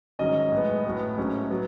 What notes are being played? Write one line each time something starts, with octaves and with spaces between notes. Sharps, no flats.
G#2 D#3 F#3 C#4 D#5
A2 G#3 B3
A2 F#3 B3
G#2 F#3 A3 C#4
F#3 B3